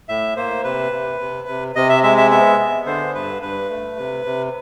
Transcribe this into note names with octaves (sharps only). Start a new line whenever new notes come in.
A2 E5
A#3 C5
C3 B4
C3
C3
C3
C3 D#5
E5
G#3 E5
E5
B3 E5
B3
D3 C5
G2 B4
G2 B4
A3
C3
C3